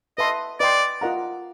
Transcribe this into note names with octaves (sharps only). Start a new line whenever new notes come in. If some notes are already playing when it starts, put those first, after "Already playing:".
B4 D#5 E5 A5 C6
B4 D5 D#5 G5 C6
F4 A#4 D#5 F#5 A#5